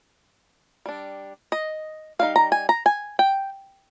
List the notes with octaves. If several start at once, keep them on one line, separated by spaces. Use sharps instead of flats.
G3 D4
D#5
G3 C4 D#4 F5
A#5
G#5
A#5
G#5
G5